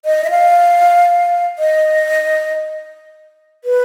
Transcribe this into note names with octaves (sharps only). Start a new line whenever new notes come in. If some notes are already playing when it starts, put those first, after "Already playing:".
D#5
E5
F5
D#5
B4